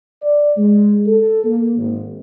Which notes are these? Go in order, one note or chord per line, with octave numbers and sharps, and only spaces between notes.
D5
G#3
A4
A#3
G#1